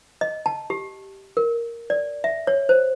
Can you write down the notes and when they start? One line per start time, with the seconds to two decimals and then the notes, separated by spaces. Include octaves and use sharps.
0.21 D#5
0.46 A5
0.70 G4
1.37 A#4
1.90 D5
2.24 E5
2.47 C#5
2.69 C5